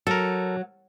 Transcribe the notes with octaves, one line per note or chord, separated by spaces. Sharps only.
F#3 A4 A#4